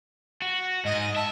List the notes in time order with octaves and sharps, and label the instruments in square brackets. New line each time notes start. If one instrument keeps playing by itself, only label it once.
[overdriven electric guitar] F#4
[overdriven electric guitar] G#2 [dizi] D#5
[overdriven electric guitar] E5 [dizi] A5